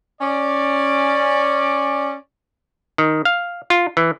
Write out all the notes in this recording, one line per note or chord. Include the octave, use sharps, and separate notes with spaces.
C#4 D5
D#3
F5
F4
E3